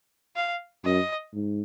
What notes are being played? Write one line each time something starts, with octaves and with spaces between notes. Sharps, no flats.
F5
F#2 D#5
G#2